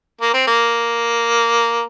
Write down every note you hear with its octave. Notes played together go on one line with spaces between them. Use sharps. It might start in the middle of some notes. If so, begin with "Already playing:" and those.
A#3
C4
A#3